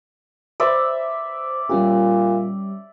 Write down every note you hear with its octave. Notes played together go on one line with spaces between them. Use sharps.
C5 D5 E5
A#2 G3 C#4 G4